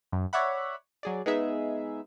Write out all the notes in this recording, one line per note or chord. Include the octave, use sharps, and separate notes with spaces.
F#2
C#5 D5 E5 F#5 B5
F#3 G#4 D5
G#3 B3 D#4 G#4 E5